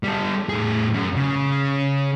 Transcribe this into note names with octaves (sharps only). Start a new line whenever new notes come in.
G3 A4
A2 G#4
F#2
C#3